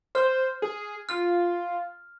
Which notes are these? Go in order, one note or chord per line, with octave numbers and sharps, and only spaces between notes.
C5 F6
G#4
F4 F6